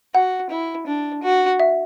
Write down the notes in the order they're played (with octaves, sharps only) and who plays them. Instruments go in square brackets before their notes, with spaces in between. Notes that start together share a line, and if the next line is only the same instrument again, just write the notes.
[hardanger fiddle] F#4 [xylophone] F#5
[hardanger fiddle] E4
D4
F#4
[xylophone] E5